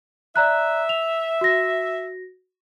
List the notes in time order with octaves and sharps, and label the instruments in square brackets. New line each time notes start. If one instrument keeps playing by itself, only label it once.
[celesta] D5 A#5 F#6 [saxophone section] E5
[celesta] F7
F#4 A#6